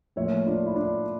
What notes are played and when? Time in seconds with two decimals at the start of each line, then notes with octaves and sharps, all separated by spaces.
0.16 A2 F3 A#3 C#5 E5
0.47 D4 F4
0.66 E4
0.76 D4